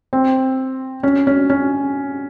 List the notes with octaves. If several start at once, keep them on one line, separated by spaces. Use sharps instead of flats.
C4
C#4
C#4
C#4